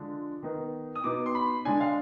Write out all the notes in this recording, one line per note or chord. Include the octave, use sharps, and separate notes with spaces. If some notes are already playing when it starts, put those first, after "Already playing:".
Already playing: D3 F3 G#3 D4
D#3 B3 D#4
D#6
B2 B3 D#4 D6
C6
B5
D3 G#3 D4 G#5
F5